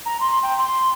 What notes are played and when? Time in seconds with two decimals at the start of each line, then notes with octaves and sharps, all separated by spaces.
0.06 A#5
0.20 C6
0.43 G5
0.58 C6